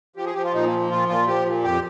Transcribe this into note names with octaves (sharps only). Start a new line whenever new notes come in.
F3 G4
G#4
F3 G4
F4
A#2 D#4
A#3
F3
A#3
A#2 F4
A#2 F4
F3 G4
A#2
F2 G4